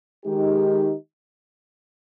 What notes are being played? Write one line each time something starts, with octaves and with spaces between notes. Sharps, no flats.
D#3 G#3 D#4 G4